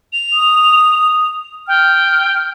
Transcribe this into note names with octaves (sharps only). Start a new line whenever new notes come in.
F7
D#6
G5 F6